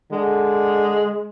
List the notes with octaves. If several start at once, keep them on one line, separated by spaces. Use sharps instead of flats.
D3 G#3